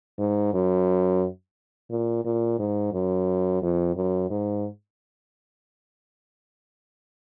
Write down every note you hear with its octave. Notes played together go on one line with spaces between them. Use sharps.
G#2
F#2
A#2
A#2
G#2
F#2
F2
F#2
G#2